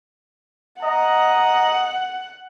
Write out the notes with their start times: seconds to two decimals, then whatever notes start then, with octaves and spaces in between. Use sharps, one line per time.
0.82 D#5 F#5 A#5